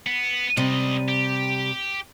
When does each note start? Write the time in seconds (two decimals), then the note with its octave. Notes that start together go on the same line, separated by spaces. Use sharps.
0.06 B3
0.57 C#2 C3 G3 D#5
1.09 G4